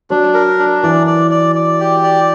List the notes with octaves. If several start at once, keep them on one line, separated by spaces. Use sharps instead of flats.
F#3 D4
A#4
D4
E3 D5
D5
D5
D5
G4
D5